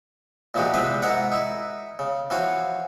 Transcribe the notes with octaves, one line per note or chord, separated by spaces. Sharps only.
A#2 E3 F3 G#3 F#4 G4
C3 E3 G#3 C4 B4 C5
G#2 D#4 E4 A#4 F#5
D#4 E4
C#3
E3 F3 F4 F#4 C#5